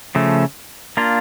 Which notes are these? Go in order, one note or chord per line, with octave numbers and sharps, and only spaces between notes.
C#3 F3 A3
A#3 D4 F4